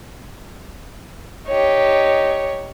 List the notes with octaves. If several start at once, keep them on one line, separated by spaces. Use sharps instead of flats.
D#4 G4 C#5